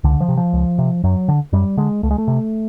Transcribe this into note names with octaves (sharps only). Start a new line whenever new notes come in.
C#2 D3
F3
C3
F3
C#2
C3
F#2 F#3
D3
F#2 G3
D3 G#3
C#2 A3
G#3
A3
C3